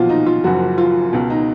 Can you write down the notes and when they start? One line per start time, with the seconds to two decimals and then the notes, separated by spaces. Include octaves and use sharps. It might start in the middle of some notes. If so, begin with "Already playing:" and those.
Already playing: B1 A#2 F3 F4 F#4
0.09 D#4
0.26 F4
0.44 F#1 F#2 F3 F#4
0.78 F4
1.13 C#2 B2
1.30 D#4